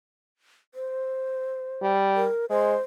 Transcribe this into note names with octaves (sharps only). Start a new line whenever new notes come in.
C5
G3
A#4
G#3 C5